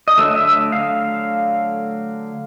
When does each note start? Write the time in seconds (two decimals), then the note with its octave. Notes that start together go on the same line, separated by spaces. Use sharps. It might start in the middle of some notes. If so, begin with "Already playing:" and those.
0.08 D#5
0.17 D3 F#3 A3 E5
0.35 E5
0.72 F5